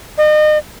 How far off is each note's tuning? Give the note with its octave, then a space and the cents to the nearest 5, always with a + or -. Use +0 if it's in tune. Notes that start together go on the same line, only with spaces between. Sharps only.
D#5 -35